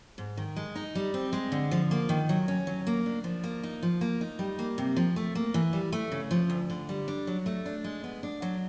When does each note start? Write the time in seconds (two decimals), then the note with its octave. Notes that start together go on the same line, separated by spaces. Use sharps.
0.18 G#2
0.37 D#3
0.56 G#3
0.75 D#4
0.95 G3
1.14 C4
1.33 G#3
1.52 D3
1.71 F3
1.91 A#3
2.09 D#3
2.29 F#3
2.48 C#4
2.67 F#3
2.87 A#3
3.06 D4
3.24 F3
3.44 A#3
3.63 D#4
3.83 F3
4.01 A#3
4.21 D#4
4.39 G3
4.59 A#3
4.78 C3
4.96 F3
5.16 A3
5.35 A#3
5.54 E3
5.73 G3
5.93 A3
6.12 C#3
6.31 F3
6.50 D2
6.70 D3
6.89 G3
7.08 D4
7.27 F#3
7.46 A3
7.66 D4
7.84 G#3
8.04 B3
8.23 D4
8.42 F#3